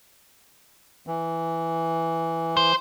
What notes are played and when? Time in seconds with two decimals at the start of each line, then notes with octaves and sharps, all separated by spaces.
1.07 E3
2.57 C5